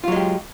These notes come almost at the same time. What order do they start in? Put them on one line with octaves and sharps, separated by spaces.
F4 F#3 G#3 G4